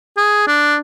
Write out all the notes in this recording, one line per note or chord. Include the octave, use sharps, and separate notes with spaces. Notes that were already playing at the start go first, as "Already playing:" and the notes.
G#4
D4